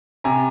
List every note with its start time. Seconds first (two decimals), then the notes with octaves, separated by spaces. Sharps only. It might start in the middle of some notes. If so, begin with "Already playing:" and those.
0.24 C3 G#5 A#5